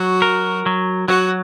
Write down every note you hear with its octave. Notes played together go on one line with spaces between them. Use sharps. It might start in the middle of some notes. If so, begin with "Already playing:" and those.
Already playing: F#3 F#4
A#4
F#3
F#3 F#4